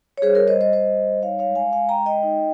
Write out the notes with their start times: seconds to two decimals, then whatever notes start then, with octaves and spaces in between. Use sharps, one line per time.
0.18 C#5
0.22 G3 G#4 C5
0.35 A#4 C#5
0.48 G3 C5 D#5
0.61 C5 D#5
0.73 G3 C5 D#5
0.98 G3
1.22 D#4 C#5 F5
1.39 C#5 F5
1.47 G#3
1.55 F5 G#5
1.73 G#3 F5 G#5
1.89 G5 A#5
1.98 G#3
2.06 D#5 G5
2.23 D#4